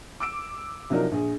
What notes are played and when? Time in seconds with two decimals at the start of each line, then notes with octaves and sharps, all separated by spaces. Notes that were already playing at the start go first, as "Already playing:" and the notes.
0.20 D6 E6 D7
0.90 C3 F3 F#3 D4 D#4 A#4
1.12 A#1 G#4